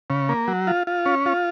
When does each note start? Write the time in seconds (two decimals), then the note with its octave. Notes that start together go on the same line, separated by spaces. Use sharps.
0.10 C#3
0.29 A#3
0.48 F#3
0.67 F4
0.87 F4
1.06 C#4
1.26 F4